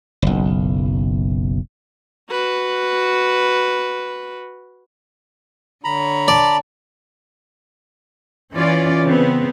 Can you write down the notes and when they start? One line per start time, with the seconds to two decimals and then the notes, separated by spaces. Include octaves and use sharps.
0.22 F#1 B1
2.30 F#4 B4
5.84 D3 C#5 A#5 B5
6.28 D5 A5
8.52 E3 C#4 F4 D5
9.05 C#3 B3 C4